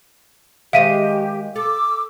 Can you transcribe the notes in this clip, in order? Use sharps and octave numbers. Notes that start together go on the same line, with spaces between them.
D#3 G#3 G4 C5 E5 F5 B6 D#7
A4 D6 E6